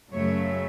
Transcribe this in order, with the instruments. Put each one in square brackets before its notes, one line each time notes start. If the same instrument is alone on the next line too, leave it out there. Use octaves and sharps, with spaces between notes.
[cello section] F#2 C#3 F#3 A3 C#5